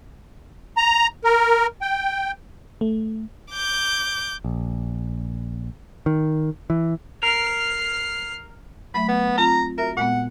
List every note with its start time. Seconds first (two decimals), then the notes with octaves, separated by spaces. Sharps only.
0.77 A#5
1.24 A#4
1.82 G5
2.81 A3
3.51 D6 G6
4.44 A#1
6.06 D#3
6.70 E3
7.23 A#4 F6 C7
8.94 F#3 A3 E5 B5
9.08 B3
9.38 C4 F4 A#5
9.78 F#4 A#4 E5
9.97 A#2 G#3 B3 F#5